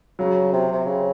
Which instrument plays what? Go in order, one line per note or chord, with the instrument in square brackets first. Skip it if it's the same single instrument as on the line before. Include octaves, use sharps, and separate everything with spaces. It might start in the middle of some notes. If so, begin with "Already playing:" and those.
[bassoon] C#3 [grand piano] F#3
[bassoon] C3
C3
C#3